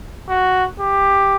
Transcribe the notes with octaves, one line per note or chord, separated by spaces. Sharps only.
F#4
G4